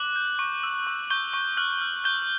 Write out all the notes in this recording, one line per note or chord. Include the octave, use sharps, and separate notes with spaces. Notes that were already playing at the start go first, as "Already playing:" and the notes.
Already playing: D6 F#6 F#7
G6
C#6
E6
C#6
C#6 G6 G7
C#6
F6 F#6 F#7
F6
F#6 G6 G7